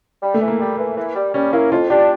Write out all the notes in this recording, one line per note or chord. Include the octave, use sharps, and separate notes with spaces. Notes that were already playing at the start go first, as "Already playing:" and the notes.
G3
A3
E3
A#3
G3
E3
E3
G3
G3 C#4
A#3 E4
F2 F4
D4 G4